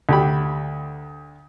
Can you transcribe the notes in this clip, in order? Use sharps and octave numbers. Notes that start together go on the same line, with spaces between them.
D2 G4 B5